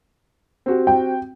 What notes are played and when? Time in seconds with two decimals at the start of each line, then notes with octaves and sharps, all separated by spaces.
0.66 C4 F#4 G4
0.87 G5